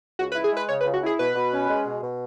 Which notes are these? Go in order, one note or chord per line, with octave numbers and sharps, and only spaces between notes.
C#2 F#4
B4
E4
G#4
G#3 B4
C#3 C#5
B4
C#2
F#4
E4 G#4
B2 B4
B2
C#4
G#3
B2
B2